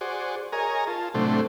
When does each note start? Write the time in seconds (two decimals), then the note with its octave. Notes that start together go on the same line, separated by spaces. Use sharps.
0.01 F#4 G#4 C5 D5
0.53 G#4 A#4 C#5 D#5 G#5 A#5
0.87 F4 A5
1.14 A2 C3 F#3 A3 D4 C5